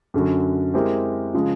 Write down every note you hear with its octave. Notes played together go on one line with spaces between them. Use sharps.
F#2 D3 F#3
G#3 C4 E4 G4 A#4
C#3 F3 G#3